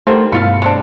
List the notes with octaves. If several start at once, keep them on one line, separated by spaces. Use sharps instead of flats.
D3 D#3 A3 G4 A#4 C5
G2 B2 E4 F4 F5 C#7
G#3 C4 D4